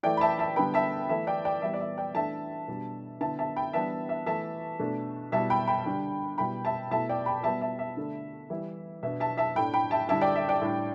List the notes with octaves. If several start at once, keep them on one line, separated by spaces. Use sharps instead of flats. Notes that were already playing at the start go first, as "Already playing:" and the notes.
E3 A3 E4 D5 G5
B5
E5 A5
E5 A5
D3 G3 B3 G5 B5
E5 A5
E3 A3 E4 E5
D5 G5
D5 G5
E3 G3 B3 E5
D5
E5
D5 G5
E3 A3 D4 E5 A5
B2 G3 D4
D3 B3 E4 E5 A5
E5 A5
G5 B5
E3 G3 B3 D4 E5 A5
E5
E3 A3 E4 E5 A5
B2 A3 D4
B2 G3 E4 E5 A5
G5 B5
G5 B5
D3 G3 D4
B2 G3 E4 G5 B5
E5 A5
B2 A3 E4 E5 A5
D5 G5
G5 B5
B2 G3 B3 E5 A5
E5 A5
E5
D3 A3 D4
E3 G3 E4
B2 B3 D4 E5
E5 A5
E5 A5
A2 A3 D4 G5 B5
G5 B5
E5 A5
D3 G3 E4 E5 A5
D5 G5
E5
D5 G5
A2 G3 D4